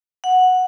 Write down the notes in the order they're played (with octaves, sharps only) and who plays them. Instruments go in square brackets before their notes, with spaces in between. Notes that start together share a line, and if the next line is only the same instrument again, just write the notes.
[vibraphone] F#5